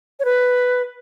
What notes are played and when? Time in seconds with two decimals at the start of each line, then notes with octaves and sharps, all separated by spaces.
0.20 C#5
0.25 B4